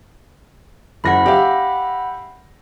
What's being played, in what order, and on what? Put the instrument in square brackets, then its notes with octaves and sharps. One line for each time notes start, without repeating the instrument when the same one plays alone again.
[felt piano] F#1 E4 A#6 [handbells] F#5 B5
[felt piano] G4 E5 F5